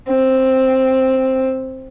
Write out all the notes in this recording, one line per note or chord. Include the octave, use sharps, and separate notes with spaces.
C4